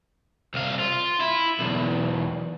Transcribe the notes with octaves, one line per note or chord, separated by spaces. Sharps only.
C2 F5
F4
E4
B1 E2